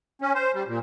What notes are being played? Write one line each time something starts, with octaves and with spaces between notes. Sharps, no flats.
C#4
C5
G3
A#2